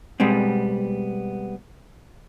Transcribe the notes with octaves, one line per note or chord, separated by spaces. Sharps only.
B2 G3 G#3 B3 C4